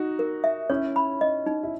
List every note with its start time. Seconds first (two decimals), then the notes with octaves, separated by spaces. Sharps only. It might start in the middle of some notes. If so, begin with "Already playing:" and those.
Already playing: D#4 F#4
0.19 A#4
0.44 E5
0.70 C#4 E4 C#5
0.96 B5
1.21 D#5
1.46 D#4
1.63 E4